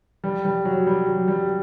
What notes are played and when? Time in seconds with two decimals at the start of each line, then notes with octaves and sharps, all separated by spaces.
0.24 G3
0.45 G3
0.65 F#3
0.87 G3
1.07 F#3
1.28 G3